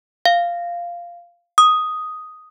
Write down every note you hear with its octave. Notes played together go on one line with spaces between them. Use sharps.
F5
D#6